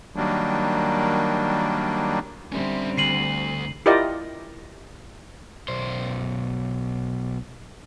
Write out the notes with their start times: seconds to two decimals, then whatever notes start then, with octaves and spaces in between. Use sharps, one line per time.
0.16 D#3 F#3 G3 A#3 D4
2.52 D3 G3 C4 C#4 E5
2.98 D2 C7 D#7 F#7
3.86 E4 F4 G4 A#4 D5 D#5
5.68 B1 C5